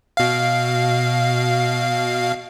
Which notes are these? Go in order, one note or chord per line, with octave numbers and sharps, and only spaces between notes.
B2 F5